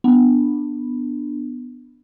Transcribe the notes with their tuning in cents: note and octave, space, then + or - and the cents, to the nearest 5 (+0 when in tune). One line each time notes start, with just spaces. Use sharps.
B3 +0 D4 +15